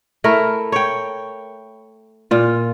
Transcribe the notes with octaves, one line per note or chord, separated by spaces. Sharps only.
A3 E4 A#4
C#5 G5
A#2 F4